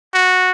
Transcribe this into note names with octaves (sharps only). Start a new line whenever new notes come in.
F#4